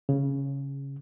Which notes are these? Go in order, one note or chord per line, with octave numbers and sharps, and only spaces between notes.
C#3